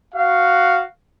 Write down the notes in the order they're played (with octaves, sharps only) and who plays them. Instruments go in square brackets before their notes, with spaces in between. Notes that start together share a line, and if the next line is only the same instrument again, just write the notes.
[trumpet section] F#4 F5